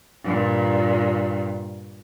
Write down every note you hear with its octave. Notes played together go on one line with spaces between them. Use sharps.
G2 A#2